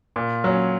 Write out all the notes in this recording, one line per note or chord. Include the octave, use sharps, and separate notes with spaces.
A#2
F#3 C#4